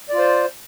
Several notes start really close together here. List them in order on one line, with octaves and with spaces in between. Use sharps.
D5 F4 C5